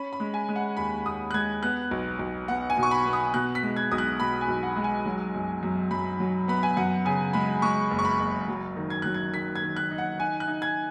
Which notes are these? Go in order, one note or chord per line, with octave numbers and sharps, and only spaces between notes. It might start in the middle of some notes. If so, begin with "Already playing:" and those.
Already playing: C#4 B5
B5
G#3
G#5
G#3
F#5
D#2 B5
D#2 D#6
F#6
G#3 G#6
B3 F#6
B1
B1
B3 F#5
G#5
B2
C#6
B5
B3
D#6
B2 F#6
B6
G#3
G#6
B1 D#6
F#6
B2 B5
G#5
B1
F#5
G#3
G#5
F#3
F#2
F#2
F#2 B5
F#3
B3 B5
G#5
F#2 F#5
C#3 G#5
G#3 B5
G#3 C#6
F#1
C#6
B5
F#1
F#3
D#3
G#6
F#3 F#6
G#6
D#3 B6
G#6
D#3
F#6
D#4
F#5
D#4 G#5
F#6
D#4
G#6